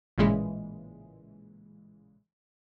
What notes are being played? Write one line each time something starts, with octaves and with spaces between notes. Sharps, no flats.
A1 A#2 C#3 E3 G#3